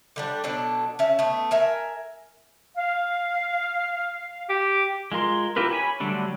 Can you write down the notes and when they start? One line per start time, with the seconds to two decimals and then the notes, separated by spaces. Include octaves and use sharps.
0.16 D3 G3 D4
0.44 B2 F#3 D4 A4
0.99 C#4 E5
1.19 A3 B3
1.51 A#4 E5 G#5
2.75 F5
4.50 G4
5.12 G#3 F4 A#4 C6
5.56 E4 F4 G4 A#4 B4
5.71 C#5 G#5 B5
6.00 D3 F#3 G3 A3 D4